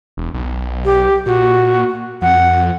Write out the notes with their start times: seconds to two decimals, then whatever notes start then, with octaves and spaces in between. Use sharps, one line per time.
0.17 E1
0.34 B1
0.85 G4
1.26 A#2 F#4
2.22 F2 F#5